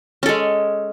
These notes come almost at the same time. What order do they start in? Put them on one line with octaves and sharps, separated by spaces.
C#4 A4 G#3